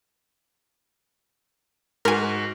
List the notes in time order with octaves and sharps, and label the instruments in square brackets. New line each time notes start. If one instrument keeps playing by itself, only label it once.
[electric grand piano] G#2 F#4 [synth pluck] A#4 G#5